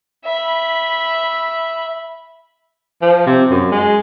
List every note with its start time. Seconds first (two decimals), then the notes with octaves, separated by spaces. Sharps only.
0.25 E5 B5
3.02 F3
3.27 C3
3.50 F#2
3.72 G#3